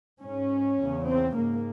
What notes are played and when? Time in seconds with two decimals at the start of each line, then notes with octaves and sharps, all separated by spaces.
0.21 G#2 C#4
0.78 E2 C#3
1.06 C4
1.34 G#2 A#3